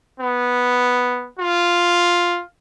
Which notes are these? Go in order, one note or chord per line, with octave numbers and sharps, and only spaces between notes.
B3
F4